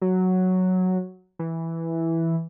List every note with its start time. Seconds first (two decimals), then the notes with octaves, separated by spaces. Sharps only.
0.01 F#3
1.39 E3